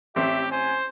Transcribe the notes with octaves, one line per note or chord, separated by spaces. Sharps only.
A1 C4 G4 E5
C5 G#5